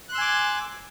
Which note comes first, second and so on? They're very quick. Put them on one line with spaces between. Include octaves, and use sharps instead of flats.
F#6 C6 E6 G#5 D6